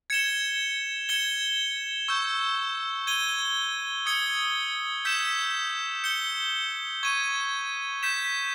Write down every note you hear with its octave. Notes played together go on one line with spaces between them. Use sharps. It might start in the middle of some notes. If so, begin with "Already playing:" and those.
G#6 C#7 E7 G7
G#6 C#7 E7 G7
C#6 E6 G6
G#6 D#7 G7
D#6 G#6 C#7 G7
E6 G6 B6 E7
G6 C#7 G7
C#6 G#6 D#7
G6 B6 E7